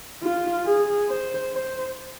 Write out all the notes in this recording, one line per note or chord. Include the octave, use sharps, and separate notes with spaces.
F4
G#4
C5
C5